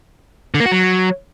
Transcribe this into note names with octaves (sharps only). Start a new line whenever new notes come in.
D3
A#3
F#4
F#3